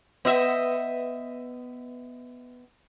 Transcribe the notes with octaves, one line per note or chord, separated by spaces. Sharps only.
B3 D#5 E5